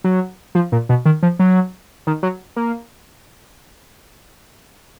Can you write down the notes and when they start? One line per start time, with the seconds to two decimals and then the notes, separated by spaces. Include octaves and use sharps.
0.04 F#3
0.55 F3
0.72 A#2
0.89 B2
1.05 D#3
1.23 F3
1.39 F#3
2.07 D#3
2.23 F#3
2.57 A#3